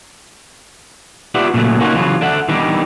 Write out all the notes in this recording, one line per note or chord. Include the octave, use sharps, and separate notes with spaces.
F4 G4 B4 D5 E5 F#5
A#2 C#3 F#3 A3
A#3 C#4 D#4 F4 F#4
C#3 E3 F#3 F4
D4 A4 E5 F#5
D#3 E3 G3 B3 D4 D#4